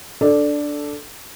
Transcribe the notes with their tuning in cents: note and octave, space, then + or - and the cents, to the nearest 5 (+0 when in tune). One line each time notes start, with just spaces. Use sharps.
D4 +0 A4 +0 D5 +0